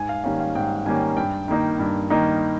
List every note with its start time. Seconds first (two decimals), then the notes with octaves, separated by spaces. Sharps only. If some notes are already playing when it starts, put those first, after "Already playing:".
Already playing: G#2 G#5
0.09 F5
0.24 D#3 G3 A#3 C#4 F5
0.40 F5
0.55 G#2 G5
0.86 D#3 G3 A#3 C#4 G#5
1.17 G2 G5
1.48 D#3 A#3 D#4
1.79 G2
2.10 D#3 A#3 D#4